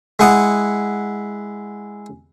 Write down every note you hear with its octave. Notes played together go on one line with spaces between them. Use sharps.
G#3 E4 F#5 D#6